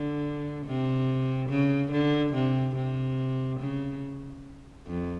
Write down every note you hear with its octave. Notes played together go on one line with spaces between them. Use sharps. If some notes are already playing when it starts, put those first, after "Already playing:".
Already playing: D3
C3
C#3
D3
C3
C3
C#3
F2